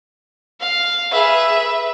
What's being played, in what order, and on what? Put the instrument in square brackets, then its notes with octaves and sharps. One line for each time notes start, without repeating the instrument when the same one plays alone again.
[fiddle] F5
[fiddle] G#4 B4 [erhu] E5
[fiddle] B4